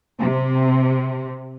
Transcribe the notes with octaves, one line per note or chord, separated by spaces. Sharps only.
C3